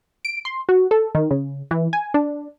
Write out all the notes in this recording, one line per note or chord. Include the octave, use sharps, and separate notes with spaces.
D7
C6
F#4
A4
D#3
C#3
E3
G#5
D4